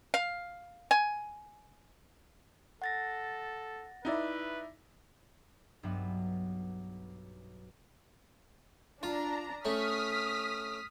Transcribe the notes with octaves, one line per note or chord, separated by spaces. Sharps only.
F5
G#5
A4 F#5 A6 A#6
D#4 E4 B4 D5
B1 G2 F#3 B3 E5
D4 F4 A#5
A3 C#4 D#6 F6 B6